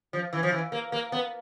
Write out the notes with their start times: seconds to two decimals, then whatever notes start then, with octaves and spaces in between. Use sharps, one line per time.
0.13 F3
0.33 E3
0.43 F3
0.52 E3
0.72 A#3
0.92 A#3
1.12 B3